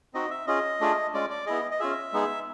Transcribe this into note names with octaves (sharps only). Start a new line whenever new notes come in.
C4 D#4 F#4 D#5
E5
C#4 F4 G#4 D#5
A3 D4 F4 G#4
G#3 C#4 F4 D5
D5
B3 E4 G#4 D#5
D#5
C#4 F4 G#4 E5
G#3 B3 D#4 G#4